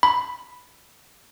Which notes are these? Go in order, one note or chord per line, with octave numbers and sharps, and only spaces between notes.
B5